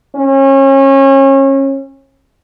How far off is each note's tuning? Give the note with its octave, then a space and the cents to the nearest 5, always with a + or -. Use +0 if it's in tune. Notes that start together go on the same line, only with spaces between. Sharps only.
C#4 -30